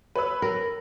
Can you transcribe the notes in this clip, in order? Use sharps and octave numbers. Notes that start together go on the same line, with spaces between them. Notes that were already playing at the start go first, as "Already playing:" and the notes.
B4 C#5 E6
A#4